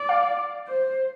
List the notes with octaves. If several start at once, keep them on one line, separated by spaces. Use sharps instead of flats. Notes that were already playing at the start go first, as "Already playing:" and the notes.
Already playing: D5
F5
C5